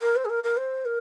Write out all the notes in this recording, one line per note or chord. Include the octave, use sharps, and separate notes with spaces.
A#4
C5
G#4
A#4
A#4
C5
A#4